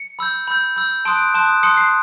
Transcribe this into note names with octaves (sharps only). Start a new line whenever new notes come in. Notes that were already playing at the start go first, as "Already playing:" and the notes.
Already playing: C#7
B5 E6 G6
B5 E6 G6
B5 E6 G6
A5 C6 D#6 F#6 D7
A5 C6 D#6 F#6
A5 C6 D#6 F#6 C#7
C7